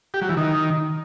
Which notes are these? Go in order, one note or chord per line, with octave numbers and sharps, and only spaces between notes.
G4
F#3
E3
D#3